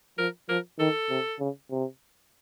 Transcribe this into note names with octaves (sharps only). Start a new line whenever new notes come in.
F3 A#4
F3 A#4
D#3 A4
C3
C#3
C3